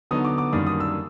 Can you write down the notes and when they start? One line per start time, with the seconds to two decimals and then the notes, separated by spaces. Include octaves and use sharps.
0.11 D3 F#3 B3 D#4 D#6
0.25 D6
0.38 D6
0.52 F#2 D#3 G3 A#3 D4 D#6
0.67 D#6
0.80 E6